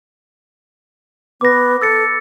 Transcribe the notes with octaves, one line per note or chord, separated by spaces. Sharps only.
B3 D6 A#6
A4 E6 A6 C#7